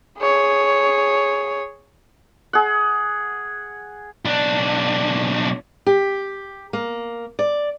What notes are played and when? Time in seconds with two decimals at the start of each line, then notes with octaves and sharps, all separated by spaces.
0.19 G#4 C#5
2.53 G#4 F#5
4.25 B1 D4
5.87 G4
6.73 A#3
7.39 D5